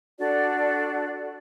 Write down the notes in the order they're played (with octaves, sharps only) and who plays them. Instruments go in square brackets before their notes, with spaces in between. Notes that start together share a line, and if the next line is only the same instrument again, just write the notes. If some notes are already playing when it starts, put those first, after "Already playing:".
[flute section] D4 F#4 A4 D5